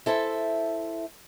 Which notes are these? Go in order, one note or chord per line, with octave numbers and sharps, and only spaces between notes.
E4 A4 C5 E5 A5